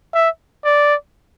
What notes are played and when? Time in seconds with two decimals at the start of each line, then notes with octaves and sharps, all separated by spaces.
0.14 E5
0.65 D5